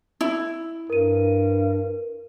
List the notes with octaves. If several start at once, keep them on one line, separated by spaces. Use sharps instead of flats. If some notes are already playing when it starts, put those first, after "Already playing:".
E4
G2 A#4 D#7